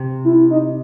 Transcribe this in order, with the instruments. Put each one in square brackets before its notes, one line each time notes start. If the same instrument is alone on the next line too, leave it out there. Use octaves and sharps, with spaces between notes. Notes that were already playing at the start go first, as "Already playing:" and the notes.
Already playing: [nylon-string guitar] C3
[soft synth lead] E4
D#4